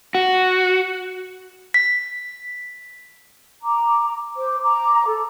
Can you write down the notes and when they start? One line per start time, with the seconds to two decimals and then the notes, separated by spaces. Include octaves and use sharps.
0.15 F#4
1.74 B6
3.62 A#5 D6
4.36 C5 D6
4.62 A#5 D6
5.05 A4